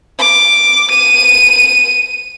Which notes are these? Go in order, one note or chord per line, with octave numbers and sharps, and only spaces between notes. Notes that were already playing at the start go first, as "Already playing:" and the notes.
D6
D#7